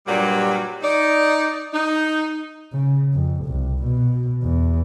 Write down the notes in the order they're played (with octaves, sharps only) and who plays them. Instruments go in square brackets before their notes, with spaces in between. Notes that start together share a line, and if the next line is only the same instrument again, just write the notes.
[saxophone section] G2 A#2 F#3 G3
D#4 D5
D#4
[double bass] C#3
F2
C2
B2
E2